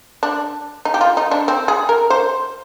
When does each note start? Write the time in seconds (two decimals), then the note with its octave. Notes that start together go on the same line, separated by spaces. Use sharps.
0.23 D4
0.85 D#4
0.94 G4
1.01 F4
1.17 D#4
1.31 D4
1.48 C4
1.68 G#4
1.89 A#4
2.10 C5